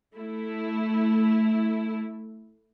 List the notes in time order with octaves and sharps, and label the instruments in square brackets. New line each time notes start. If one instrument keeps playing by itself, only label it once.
[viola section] A3 E4